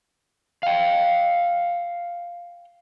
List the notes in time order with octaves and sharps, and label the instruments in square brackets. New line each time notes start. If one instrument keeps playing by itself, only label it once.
[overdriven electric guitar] F5 G5